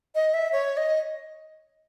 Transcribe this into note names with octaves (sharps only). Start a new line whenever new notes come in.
D#5
E5
C#5
D#5